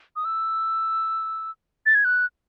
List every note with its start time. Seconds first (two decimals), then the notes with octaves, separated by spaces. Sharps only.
0.16 D#6
0.25 E6
1.86 A6
1.95 G#6
2.05 F#6